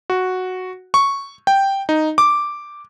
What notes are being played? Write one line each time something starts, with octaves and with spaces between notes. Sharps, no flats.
F#4
C#6
G5
D#4
D6